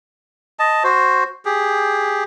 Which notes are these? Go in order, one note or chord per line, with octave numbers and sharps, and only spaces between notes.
D#5 A5
F#4 C5
G4 G#4